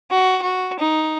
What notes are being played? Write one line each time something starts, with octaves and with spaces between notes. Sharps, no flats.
F#4
F#4
D#4